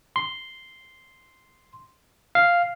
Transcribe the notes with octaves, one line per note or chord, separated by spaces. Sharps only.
C6
F5